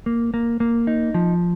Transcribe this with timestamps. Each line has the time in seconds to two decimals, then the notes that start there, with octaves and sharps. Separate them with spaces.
0.06 A#3
0.34 A#3
0.60 A#3
0.87 D#4
1.14 F3